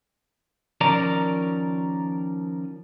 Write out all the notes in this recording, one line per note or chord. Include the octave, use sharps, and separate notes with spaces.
D#3 F3 C#4 A#4 D5 A#5